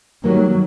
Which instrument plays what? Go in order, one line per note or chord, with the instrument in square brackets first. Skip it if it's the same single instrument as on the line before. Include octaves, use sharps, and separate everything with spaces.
[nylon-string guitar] D#3 G3 A#3 [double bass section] F#3